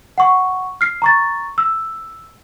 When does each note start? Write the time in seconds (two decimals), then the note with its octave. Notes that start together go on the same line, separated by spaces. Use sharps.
0.18 F#5 C#6
0.81 F6 C7
1.02 A#5 C#6 A6
1.58 E6